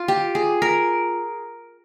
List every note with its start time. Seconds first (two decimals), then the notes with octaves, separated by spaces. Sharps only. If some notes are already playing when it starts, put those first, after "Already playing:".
Already playing: F4
0.08 G4
0.35 G#4
0.62 A#4